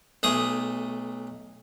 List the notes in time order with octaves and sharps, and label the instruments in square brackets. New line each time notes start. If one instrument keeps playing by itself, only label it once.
[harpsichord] B1 A3 G#4 D#6